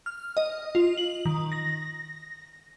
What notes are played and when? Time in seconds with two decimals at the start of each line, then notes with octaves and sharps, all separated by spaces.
0.06 F6
0.37 D#5
0.75 F4
0.97 F#7
1.25 D#3
1.52 A#6